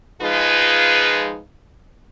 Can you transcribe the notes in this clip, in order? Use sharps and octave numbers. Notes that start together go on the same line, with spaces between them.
F3 G#3 D#4 F4 G#4 B4